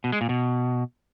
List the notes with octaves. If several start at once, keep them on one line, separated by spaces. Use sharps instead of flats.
B2
G#3
A#2
B2